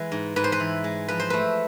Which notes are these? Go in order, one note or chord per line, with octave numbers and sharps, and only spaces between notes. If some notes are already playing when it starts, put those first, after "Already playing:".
Already playing: E3 G#3 B4
G#2
G#2 B4
C5
B4
E3
G#3
F3 B4
C5
A3 B4